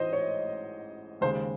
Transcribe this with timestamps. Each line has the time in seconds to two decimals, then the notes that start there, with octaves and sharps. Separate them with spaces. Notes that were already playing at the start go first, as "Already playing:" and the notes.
Already playing: A1 G#2 E3 G#3 C5 D#5
0.13 C#5
1.21 D#2 C#3 G#3 C5